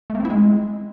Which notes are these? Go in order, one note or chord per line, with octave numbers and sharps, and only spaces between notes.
A3
A#3
C4
E4
G#3